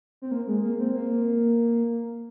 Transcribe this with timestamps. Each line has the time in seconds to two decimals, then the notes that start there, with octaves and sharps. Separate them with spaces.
0.22 C4
0.31 A#3
0.47 G#3
0.63 A#3
0.79 C4
0.94 A#3